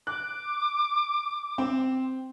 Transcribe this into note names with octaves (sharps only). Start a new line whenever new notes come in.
D6 F#6
C4